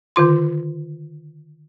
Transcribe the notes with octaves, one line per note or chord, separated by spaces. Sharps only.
D3 D#3 F4 C6